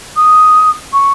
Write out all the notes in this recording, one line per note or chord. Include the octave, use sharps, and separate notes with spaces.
D#6
C#6